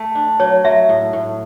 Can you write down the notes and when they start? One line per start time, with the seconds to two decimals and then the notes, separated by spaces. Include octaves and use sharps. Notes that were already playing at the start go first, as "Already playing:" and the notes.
Already playing: A3
0.15 D4
0.40 F#3 C#5
0.65 F#3 E5
0.89 A2
1.13 A2